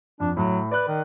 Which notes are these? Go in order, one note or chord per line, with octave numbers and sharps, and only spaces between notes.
F2 D4
A2 F#3
B4 D5 F#6
D#3